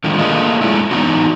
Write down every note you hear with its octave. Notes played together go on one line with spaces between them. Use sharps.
D3 D#3 F3 G#3
A3 A#3 D4 F4 G#4 D#5
F#3 G#3 A3 D4 E4
E3 F3 B3 D4 D#4 F#4